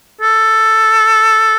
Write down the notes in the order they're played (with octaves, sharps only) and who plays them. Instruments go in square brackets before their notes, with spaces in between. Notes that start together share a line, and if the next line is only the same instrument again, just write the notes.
[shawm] A4